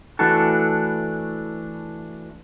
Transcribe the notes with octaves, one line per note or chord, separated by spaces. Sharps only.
E3 A3 D4 E4 F#4 A4